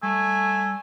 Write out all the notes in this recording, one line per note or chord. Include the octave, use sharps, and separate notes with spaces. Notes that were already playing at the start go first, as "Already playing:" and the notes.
G3 A3 G#5